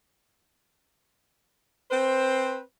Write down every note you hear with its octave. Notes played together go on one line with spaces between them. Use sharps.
C4 B4 C5